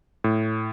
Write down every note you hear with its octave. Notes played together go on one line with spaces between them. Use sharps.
A2